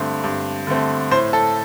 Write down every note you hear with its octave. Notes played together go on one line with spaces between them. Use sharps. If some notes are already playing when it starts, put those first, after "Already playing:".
Already playing: G2 D3 A3 C4
G2
D3 A3 C4
A2 C5
A4